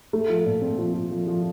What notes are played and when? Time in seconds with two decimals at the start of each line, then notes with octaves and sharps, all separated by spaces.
0.13 A3
0.29 F3
0.46 A#2
0.62 C4
0.79 F3
0.94 F3
1.11 F3
1.27 F3